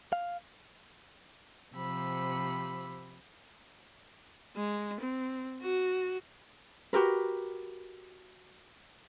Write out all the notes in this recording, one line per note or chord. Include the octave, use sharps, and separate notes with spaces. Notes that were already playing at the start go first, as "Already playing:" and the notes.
F5
C3 F3 G4 B5 E6
G#3
C4
F#4
F#4 G4 A#4 B4